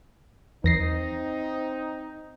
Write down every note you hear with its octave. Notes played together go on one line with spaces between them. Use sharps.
E2 C4 D#4 A#6 C7